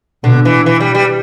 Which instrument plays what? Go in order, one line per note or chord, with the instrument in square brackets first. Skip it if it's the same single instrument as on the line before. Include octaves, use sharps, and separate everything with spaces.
[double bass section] B2 [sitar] D3
[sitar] E3
E3
G3
G3